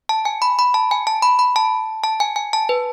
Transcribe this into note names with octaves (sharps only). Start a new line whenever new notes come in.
A5
G#5
B5
B5
A5
G#5
A5
B5
B5
A5
A5
G#5
G#5
A5
B4